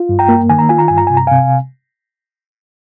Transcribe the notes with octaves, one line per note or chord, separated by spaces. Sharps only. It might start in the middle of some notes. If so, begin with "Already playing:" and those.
Already playing: F4
G2
G5 A#5
A#3
D#3 G#5
A#5
F4 G#5
A#5
G2 G#5
A#5
C3 G#5
A#5
C3 F5 G#5